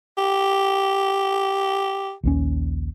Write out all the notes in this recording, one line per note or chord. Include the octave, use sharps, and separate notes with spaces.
G4
A#1 D#2 C#4